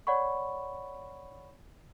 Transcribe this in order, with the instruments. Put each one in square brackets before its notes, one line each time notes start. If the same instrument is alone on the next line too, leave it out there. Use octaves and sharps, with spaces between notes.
[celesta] C#5 D5 F#5 B5 C#6